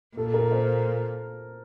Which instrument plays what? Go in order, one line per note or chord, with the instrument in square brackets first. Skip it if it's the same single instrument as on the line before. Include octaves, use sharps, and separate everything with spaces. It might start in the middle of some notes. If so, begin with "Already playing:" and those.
[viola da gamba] A#2 [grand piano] A4
[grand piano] A#4
C5